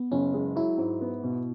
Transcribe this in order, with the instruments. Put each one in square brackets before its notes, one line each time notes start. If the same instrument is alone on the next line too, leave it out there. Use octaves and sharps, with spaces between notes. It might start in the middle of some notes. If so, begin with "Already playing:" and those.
Already playing: [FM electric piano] B3
[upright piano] F#1 [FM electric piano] C#4
[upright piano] G#3
[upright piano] F#3 [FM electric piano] E4
[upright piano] G#2
B3
B2